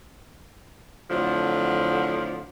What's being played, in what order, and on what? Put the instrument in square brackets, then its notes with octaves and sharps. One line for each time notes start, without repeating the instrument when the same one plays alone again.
[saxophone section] F2 A2 D3 F3 F#3